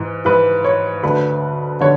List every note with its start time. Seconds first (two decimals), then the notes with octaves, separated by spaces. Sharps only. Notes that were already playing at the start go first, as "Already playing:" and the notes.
Already playing: G#2 E3
0.25 G#2 E3 B4
0.65 C#5
1.03 D2 D3 B4
1.80 D3 C#5